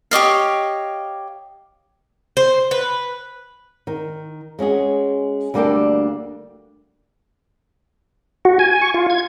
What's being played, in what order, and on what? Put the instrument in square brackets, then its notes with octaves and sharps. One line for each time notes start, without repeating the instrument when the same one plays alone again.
[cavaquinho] G4 C#5 D#5 F5
[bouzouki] C5
B4
[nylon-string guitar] D#3
G#3 C#4 F#4 G#4
D2 G3 A#3 D4 A4 G5
[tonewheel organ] F#4
G#5
C#6
F4
G#6